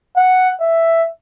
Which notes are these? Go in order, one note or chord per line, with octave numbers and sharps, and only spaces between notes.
F#5
E5